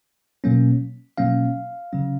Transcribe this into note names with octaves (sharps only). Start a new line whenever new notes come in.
B2 F#3 A#3 C#4
B2 F#3 A#3 C#4 F5
C#3 F#3 C#4